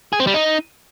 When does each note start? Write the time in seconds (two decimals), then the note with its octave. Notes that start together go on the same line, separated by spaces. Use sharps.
0.13 G#4
0.20 C4
0.27 G3
0.34 D#4